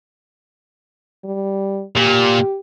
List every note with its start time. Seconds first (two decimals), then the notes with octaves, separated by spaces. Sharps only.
1.25 G3
1.97 A#2 G4